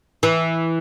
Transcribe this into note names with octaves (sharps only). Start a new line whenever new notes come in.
E3